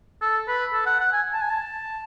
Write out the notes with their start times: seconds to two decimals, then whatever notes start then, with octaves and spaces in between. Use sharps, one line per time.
0.22 A4
0.48 B4
0.73 A4
0.86 F#5
1.00 F#5
1.12 G#5
1.33 A5
1.42 G#5
1.50 A5